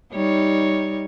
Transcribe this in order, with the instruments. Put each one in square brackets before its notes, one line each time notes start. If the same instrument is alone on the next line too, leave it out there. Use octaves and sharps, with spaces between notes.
[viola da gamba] G3 D#4 C#5